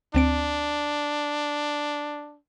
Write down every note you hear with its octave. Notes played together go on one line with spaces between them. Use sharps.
D2 C4 D4 D7